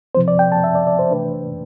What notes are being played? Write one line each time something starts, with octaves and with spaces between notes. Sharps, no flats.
C3 F3 C4 C5
D5
G5
A5
E5
D5
D5
C5
C3 E3 A3 D4 B4